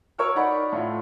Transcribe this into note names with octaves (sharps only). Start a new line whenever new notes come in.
A#4 C#5 C#6 E6 F6
D#4 D5 F#5 B5
A2 F4